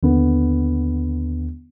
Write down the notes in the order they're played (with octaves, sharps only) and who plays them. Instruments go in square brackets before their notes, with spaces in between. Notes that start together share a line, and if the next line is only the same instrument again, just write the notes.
[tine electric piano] D#2 [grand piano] D3 B3